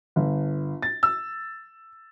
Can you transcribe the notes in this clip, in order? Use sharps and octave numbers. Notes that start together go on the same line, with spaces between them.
G1
A6
E6